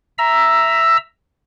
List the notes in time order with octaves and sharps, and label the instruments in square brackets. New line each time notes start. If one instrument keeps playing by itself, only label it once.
[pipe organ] E5 A#5 E6